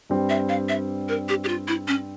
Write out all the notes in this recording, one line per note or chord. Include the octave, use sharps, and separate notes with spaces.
G2 G3 C4
E5
F5
E5
A#4
G4
G4
F4
E4
C#4